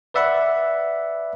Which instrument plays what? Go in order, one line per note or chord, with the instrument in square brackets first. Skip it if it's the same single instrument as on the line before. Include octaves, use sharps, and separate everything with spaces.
[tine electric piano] B4 D5 E5 F#5 B5